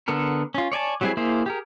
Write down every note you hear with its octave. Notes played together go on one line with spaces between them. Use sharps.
D3 B3 A4 A#4
C#4 F4
C#5 D5 G#5 A5
F#3 G3 C4 E4 G#4
A#3 E4 G#4 C5
G4 G#4 A#4